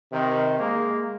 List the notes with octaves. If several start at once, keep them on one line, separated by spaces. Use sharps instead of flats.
C3 D#3
G#3 A#3